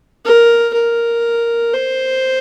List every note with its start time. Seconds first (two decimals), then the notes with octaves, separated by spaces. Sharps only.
0.25 A#4
0.74 A#4
1.74 C5